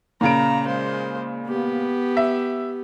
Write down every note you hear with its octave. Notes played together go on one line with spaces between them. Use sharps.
A#2 C#3 A#5 D7
G#3 C5
B3 G4
E5